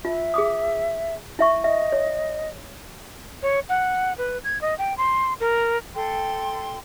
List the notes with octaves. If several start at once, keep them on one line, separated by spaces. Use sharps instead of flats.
F4 E5
G#4 D6 D#6
E4 E5 C#6
D#5 E5
C#5
C#5
F#5
B4
G#6
D#5
G5
C6
A#4
A4 G5 C6